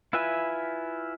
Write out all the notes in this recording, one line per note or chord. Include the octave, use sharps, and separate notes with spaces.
E4 F4 B4 E5 G#5